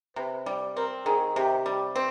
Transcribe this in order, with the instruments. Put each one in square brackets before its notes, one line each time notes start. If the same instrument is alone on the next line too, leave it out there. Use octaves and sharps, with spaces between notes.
[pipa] C3 [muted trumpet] B4
[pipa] G3
[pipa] C4 [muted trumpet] A#4
[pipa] D#3 [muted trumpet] G#4
[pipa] C3 [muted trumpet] G4
[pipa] G3
C4